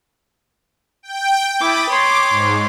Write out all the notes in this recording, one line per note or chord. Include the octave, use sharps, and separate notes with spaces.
G5
E4 B5 D6 D#6 A6
C#5 C6 D6
G#2